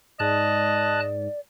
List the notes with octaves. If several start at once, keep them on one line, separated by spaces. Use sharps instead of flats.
G#2 D5 D#5 A5 F#6